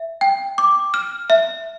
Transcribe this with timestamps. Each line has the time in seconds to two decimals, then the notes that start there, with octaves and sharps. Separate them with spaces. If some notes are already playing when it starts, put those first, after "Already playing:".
Already playing: E5
0.21 G5
0.58 D6
0.94 F6
1.30 E5